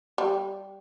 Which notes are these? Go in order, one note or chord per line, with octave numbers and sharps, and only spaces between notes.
G3